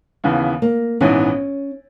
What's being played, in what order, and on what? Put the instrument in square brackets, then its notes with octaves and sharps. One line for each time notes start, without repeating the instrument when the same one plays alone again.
[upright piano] D#2 C#3 E3 B3
[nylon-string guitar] A#3
[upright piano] A#1 G#2 E3 B3 [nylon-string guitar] C#4